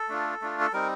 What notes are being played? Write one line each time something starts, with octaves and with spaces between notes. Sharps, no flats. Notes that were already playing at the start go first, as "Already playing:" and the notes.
Already playing: A4
A3 D4 F4
A3 D4 F4
A4
G3 C4 D#4 A#4